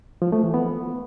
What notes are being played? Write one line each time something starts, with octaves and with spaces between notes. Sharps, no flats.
F3
A3
E3
B3